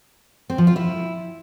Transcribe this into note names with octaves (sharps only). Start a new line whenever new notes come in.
C4
F3
F4
E4